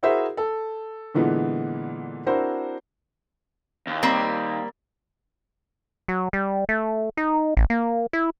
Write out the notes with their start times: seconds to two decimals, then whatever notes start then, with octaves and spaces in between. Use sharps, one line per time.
0.03 E4 F#4 G#4 A#4 C5 E5
0.37 A4
1.14 A#2 D3 E3 G#3 B3
2.26 C4 D4 E4 F#4 A#4 C5
3.87 D#2
4.03 G3 A#3 C4
6.08 F#3
6.33 G3
6.69 A3
7.17 D#4
7.57 A1
7.70 A#3
8.13 E4